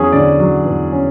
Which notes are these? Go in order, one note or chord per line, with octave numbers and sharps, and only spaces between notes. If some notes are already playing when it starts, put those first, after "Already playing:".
Already playing: E2 F#3 C#4 G#4
D3 D5
F#3
E2
C#4